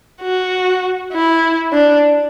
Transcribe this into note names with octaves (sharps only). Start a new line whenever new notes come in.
F#4
E4
D4